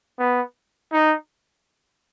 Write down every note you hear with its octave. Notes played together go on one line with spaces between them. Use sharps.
B3
D#4